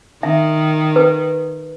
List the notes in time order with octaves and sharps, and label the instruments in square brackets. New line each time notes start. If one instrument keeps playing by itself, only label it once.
[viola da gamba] D#3 [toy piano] E5
[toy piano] B4